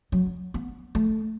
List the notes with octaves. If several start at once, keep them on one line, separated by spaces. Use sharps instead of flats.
F#3
B3
A3